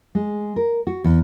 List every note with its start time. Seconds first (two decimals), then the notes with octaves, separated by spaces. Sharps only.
0.15 G#3
0.56 A#4
0.87 F#4
1.04 E2